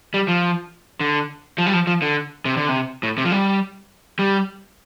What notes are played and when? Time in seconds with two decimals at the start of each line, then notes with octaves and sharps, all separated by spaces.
0.14 G3
0.28 F3
1.00 D3
1.58 F3
1.66 G3
1.73 F3
1.87 F3
2.02 D3
2.45 C3
2.57 D3
2.69 C3
3.03 A2
3.18 C3
3.25 F3
3.32 G3
4.19 G3